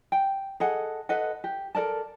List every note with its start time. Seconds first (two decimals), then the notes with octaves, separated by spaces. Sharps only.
0.12 G5
0.60 G#4 A4 D#5 F#5
1.09 A4 B4 D#5 F#5
1.44 G4
1.75 A4 A#4 D5 A5